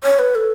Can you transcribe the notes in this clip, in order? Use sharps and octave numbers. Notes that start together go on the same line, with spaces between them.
C#5
B4
A4